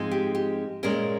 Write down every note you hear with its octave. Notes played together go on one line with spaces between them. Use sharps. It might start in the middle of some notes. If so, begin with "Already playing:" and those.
Already playing: G#2 F3 G#3 C4
G4
G4
A#2 G#3 C#4 A#4